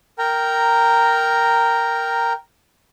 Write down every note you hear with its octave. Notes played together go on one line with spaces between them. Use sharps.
A#4 G5 A#5